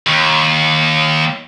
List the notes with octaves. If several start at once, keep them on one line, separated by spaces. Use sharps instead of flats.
D#2